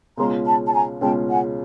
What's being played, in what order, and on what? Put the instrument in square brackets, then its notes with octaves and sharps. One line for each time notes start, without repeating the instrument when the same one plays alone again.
[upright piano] C#2 B2 G#3 C#4 F4 [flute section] A#5 C6
[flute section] A5 B5
A5
G#5 A#5
[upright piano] C#2 B2 G#3 C#4 F4 [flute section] G5 A5
[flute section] F#5 G#5